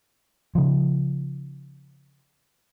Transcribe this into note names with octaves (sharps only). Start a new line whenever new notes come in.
C#3 F3